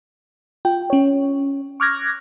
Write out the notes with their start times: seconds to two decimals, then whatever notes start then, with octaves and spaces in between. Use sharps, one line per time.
0.65 F4 G5
0.90 C#4 C#5
1.80 C#6 D6 F6 F#6 G#6 A#6